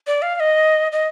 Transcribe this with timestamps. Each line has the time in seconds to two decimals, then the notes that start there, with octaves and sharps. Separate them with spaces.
0.07 D5
0.22 F5
0.35 F5
0.40 D#5
0.92 D#5